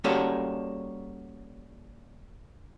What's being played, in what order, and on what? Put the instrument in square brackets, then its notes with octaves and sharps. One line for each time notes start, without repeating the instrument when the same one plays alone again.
[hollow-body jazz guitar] G3 A#3 C#4 F#4 G#4 A4